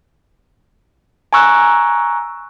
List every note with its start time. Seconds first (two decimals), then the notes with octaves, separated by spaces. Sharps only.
1.33 G#5 A#5 C#6 E6 F#6